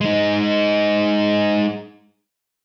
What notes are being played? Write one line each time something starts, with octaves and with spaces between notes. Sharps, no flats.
G#3 D#4